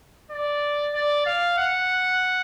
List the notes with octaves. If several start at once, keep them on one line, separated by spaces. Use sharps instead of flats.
D5
D5
F5
F#5